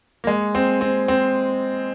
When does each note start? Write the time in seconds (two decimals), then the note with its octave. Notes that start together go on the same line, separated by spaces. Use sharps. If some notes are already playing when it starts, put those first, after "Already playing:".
0.24 A#3
0.27 G#3
0.55 C4
0.81 C4
1.08 C4